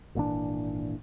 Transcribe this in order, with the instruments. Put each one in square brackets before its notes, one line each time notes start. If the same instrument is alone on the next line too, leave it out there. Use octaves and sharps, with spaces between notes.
[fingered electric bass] G#1 A#2 E3 D4